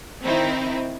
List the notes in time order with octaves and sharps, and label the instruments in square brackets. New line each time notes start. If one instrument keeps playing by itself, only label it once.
[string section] D#3 C4 D#4 E4